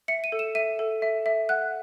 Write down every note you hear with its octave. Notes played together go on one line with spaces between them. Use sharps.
E5 C#7
D#7
A4
E7
E5 D#7
A4
E5
E5
F#5 F#6